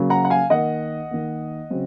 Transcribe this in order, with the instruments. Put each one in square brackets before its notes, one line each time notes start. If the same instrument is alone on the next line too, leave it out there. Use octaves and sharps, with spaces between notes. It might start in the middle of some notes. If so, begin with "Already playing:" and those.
Already playing: [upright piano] C#3 F#3 A#3
F#5 A#5
F#5
F5 G#5
D#3 A#3 D#5 F#5
D#3 A#3
C#3 F#3 C4